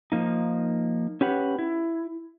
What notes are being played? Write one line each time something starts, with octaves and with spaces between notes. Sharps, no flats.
F3 A#3 D#4
C#4 G4 B4 F#5
E4